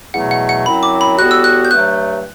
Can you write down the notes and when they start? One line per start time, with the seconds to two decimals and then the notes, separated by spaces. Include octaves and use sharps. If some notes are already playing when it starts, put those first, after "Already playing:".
0.13 E2 B2 F#3 A3 F#5
0.31 F#5
0.49 F#5
0.66 F#2 F#3 C4 E4 B5
0.83 D6
1.01 B5
1.18 A2 G3 B3 F#4 F#6
1.31 E6
1.44 F#6
1.65 G6
1.71 G2 F#3 A3 F#6